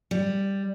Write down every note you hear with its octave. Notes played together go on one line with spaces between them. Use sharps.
G3